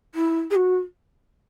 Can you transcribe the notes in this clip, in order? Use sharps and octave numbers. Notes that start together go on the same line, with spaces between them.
E4
G#4
F#4